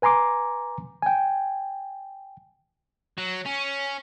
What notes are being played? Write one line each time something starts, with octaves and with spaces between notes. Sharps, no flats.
B4 G#5 A#5 C6 D6
G5 G#5
F#3
C#4